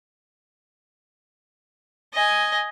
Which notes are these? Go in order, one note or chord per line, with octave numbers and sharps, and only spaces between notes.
D#5 G#5